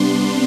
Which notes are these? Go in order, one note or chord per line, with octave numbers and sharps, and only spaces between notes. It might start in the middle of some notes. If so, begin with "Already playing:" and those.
Already playing: C3 G3 B3 D4 C6